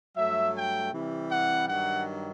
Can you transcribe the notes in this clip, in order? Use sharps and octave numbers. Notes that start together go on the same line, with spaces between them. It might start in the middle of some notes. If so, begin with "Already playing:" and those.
G2 F#3 A3 E5
G5
C3 E3 G3
F#5
G2 D#3 F#3 F#5